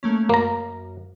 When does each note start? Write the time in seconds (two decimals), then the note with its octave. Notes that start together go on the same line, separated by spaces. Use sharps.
0.03 A3 A#3 C#4
0.29 F#2 A#3 A#5